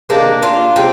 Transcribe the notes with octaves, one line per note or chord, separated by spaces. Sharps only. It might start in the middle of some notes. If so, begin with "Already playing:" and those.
C3 D#3 G#3 A#3 D4
D4 F4
C3 F3 G#3 C4